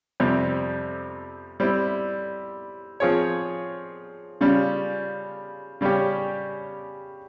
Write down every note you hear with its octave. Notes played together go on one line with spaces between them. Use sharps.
F2 C3 G3
G3 C4 E4
F3 C4 F4 G#4 C#5
C#3 G3 C#4 F4
C#3 G3 C#4 G4